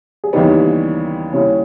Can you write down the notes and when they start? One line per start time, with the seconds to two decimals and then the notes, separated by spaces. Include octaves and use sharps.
0.24 G#4
0.33 D#2 C#3 E3 G3 B3 D#4 G4
1.33 D#2 C#3 G3 C#4 E4